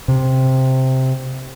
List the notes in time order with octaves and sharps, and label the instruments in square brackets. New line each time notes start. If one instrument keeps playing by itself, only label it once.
[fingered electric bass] C3